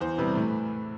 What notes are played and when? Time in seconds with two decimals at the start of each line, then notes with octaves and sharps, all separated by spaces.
0.01 E2 C5
0.18 C3 G3 B4
0.35 A2